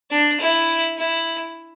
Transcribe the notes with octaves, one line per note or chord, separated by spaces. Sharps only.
D4
E4
E4